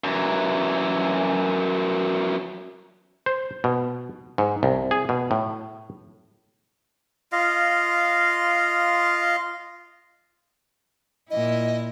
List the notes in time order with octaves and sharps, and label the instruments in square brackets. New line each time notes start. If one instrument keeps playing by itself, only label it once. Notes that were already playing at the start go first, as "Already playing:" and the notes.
[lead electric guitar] F#2 E3
[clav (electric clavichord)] C5
B2
G#2
C2
G#4
B2
A2
[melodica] F4 D#5 F5
[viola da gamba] A#2 E4 [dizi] D#5